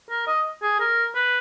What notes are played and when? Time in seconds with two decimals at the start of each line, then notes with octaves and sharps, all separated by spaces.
0.10 A#4
0.27 D#5
0.63 G#4
0.80 A#4
1.15 B4